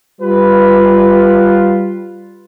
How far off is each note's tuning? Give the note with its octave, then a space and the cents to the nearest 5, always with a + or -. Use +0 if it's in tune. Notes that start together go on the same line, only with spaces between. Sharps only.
G3 +0 F4 +0 B4 +0